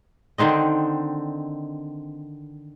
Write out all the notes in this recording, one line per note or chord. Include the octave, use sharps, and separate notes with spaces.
D3 D#3 C4 D#5